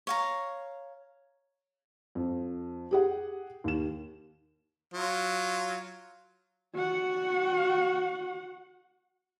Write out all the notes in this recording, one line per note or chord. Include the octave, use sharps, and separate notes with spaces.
C#5 F5 A#5
F2
G4 G#4 F#5
D#2 E7
F#3 F4
F#4 F#5